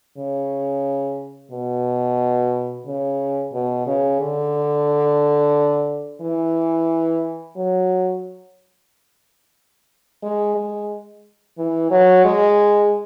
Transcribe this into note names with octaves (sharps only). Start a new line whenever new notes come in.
C#3
B2
C#3
B2
C#3
D3
E3
F#3
G#3
G#3
E3
F#3
G#3